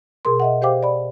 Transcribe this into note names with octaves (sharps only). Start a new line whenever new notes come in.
B2 G#4 A#4 C6
D#5 E5 F#5
G4 C5 F5 G5 D6
D5 B5